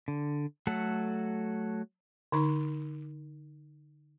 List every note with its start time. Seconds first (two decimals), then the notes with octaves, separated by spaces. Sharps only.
0.08 D3
0.67 F#3 A3 A4 F#5
2.32 D3 D#4 C#6